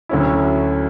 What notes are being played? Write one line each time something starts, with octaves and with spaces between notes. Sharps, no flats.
D2 D3 F#3 C#4 E4